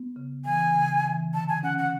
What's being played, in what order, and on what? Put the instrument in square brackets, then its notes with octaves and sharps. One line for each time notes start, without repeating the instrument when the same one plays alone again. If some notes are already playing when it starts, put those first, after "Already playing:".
Already playing: [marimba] B3
C#3
[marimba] E3 [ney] G#5
[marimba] C#3
E3
[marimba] D3 [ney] A5
[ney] G#5
[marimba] C#4 [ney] F#5
[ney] F#5